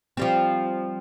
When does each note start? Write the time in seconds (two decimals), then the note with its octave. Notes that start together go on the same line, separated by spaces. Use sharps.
0.17 F3 G3 C4